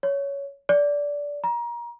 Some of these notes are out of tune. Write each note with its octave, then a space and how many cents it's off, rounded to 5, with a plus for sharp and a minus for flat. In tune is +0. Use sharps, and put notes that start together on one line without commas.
C#5 +15
D5 -15
A#5 +30